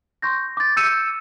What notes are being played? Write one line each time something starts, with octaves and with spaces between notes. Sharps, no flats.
C6 C#6 G6 A#6
D6 A6
E6 G6 C#7 D#7 E7